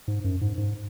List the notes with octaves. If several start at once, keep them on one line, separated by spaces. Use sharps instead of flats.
G#2
F#2
G#2
G#2